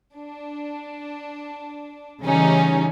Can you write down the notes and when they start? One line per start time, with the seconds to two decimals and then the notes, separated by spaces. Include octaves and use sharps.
0.15 D4
2.23 C#3 E3 G3 A3 C#4 D#4